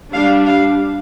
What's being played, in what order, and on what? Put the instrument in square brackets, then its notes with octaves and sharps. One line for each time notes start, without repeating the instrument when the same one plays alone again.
[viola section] G3 D4 F5
F5